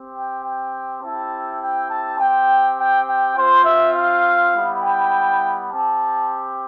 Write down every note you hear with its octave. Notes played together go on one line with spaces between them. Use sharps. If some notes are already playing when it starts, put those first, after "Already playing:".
Already playing: C4 G4
G5
G5
C4 E4 G4 A5
G5
A5
C4 G4 G5
G5
G5
C4 F4 C5
E5
F5
G3 B3 E4
G5
C4 G4 A5